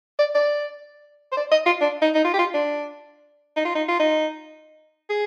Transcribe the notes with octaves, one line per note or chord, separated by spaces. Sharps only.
D5
D5
C5
D5
D#5
F4
D4
D#4
D#4
F4
G4
F4
D4
D#4
F4
D#4
F4
D#4
G#4